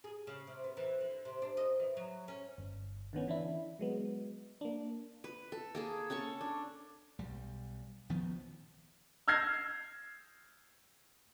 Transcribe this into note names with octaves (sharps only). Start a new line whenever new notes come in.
G#4
C#3
C3
B3
E3
D3
C3
D4
D#5
E3
F#3
C#4
G1
D3 D#3 B3 C#4
E3 D4 E4
F#3 G#3 B3
A#3 D4
B4
A4
A#3 G#4 A4
C#4 A4 A5 C#6
D4
B1 G3
A#1 D#3 F3 B3
E6 F6 G6 G#6 A#6 C7